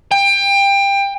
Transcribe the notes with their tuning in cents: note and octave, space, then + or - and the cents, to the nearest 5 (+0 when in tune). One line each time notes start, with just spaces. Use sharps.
G5 +25